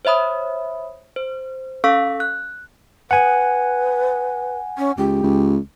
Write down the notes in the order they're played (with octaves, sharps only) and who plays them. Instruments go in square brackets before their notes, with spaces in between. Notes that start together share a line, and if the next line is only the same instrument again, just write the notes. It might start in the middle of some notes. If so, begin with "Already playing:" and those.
[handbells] C5 C#5 E5 B5 D#6
C5
C#4 A4 F5 C#6 E6 B6
F#6
[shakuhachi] B4 [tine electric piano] F#5 G#5
[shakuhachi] C#4
[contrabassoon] C#2 [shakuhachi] G4
[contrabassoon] C#2